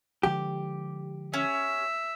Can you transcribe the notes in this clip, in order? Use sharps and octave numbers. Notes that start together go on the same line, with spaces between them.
D3 F3 G#3 G4
C#4 E5